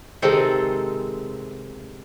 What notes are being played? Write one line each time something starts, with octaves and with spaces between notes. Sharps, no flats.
C3 D#3 G#3 C4 A4 C5